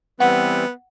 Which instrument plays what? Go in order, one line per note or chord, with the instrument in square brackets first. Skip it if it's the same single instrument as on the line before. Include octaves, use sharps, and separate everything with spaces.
[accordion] E3 G3 C4 [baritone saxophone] B3 [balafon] F#5